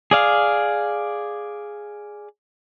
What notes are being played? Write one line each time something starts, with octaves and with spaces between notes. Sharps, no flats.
G#4 D5 F5